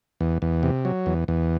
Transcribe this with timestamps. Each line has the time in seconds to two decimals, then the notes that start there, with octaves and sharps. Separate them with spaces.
0.21 E2
0.42 E2
0.63 C3
0.85 F#3
1.06 E2
1.28 E2